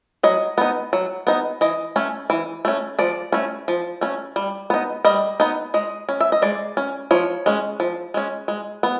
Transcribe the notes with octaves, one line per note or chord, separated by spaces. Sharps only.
F#3 D#5
B3 D#4
F#3
B3 D#4
E3 D#5
A3 C#4
E3
A3 C#4
F3 D5
A3 C#4
F3
A3 C#4
G3
B3 D#4
G3 D#5
B3 D#4
G#3 D#5
C#4
E5
D#5
G#3 D5
C#4
F3 C#5
G#3 C#4
F3
G#3 C#4
G#3
B3